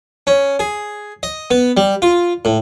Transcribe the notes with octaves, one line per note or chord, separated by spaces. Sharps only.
C#4
G#4
D#5
B3
G3
F4
A2